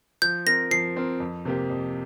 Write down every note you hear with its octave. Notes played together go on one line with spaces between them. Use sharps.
F3 G6
C4 A#4 A#6
F3 C7
C4 A#4
F2
C3 A#3 G4
F2